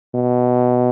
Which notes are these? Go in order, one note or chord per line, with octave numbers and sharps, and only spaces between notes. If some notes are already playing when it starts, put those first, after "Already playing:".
B2